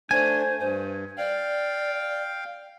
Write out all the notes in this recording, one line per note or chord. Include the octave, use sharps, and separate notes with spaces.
A3 D4 C5 G#5
G2 C5
D5 F5 G5